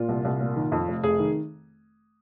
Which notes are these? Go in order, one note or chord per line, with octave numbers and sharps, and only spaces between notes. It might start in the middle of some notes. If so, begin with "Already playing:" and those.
Already playing: A#2 F4
C2
C2
A#2
D#3
F2
F1
F1 G#4
D#3